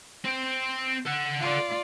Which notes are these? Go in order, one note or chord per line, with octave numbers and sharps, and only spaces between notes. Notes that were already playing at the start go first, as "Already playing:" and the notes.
C4 C5
A4 F#5
F4 D5